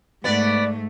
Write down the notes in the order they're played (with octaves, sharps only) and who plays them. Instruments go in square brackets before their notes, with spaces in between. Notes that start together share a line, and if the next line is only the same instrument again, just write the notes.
[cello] G#2 A3 [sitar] B3 D5